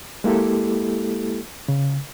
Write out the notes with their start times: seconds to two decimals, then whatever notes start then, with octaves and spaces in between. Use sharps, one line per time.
0.24 G#3 A#3 E4 G4 A4
1.68 C#3